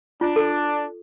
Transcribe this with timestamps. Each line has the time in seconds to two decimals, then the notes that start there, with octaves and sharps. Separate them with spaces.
0.21 D4 F4
0.36 A4